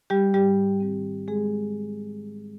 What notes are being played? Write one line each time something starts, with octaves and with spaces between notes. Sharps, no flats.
G3 G4
G#2 G3 G4
D#3 G3 C4
G#3 G#4